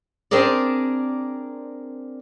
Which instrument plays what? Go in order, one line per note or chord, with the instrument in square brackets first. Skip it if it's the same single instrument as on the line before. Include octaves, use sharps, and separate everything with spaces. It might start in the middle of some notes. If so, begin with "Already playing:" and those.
[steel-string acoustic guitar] C4 D4 G#4 A#4 D5